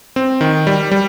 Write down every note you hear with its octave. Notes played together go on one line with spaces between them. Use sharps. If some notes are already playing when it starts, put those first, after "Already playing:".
C4
D#3
G3
G3